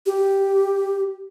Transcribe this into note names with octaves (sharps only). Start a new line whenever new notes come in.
G4